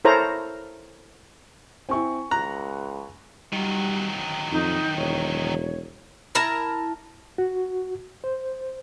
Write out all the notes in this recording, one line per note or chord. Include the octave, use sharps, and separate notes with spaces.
E4 A4 A#4 C5 C#5 A#5
C4 E4 G#5 C#6
C#2 A#5 F#6
D#3 F#3 G3
F2 D#4
E1 C#5
E4 A#4 A5 A#5
F#4
C5